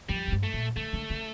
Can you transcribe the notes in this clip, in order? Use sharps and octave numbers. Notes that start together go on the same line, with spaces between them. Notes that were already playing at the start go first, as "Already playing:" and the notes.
F2 G3
A2
G2
A3
A#2
D3 A3
D3
C#3